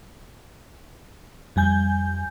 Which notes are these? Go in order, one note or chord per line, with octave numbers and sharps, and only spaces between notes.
F2 G3 G#5 G6